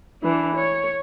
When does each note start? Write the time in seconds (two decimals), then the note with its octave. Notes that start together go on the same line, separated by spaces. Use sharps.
0.22 E3 D4
0.56 C#5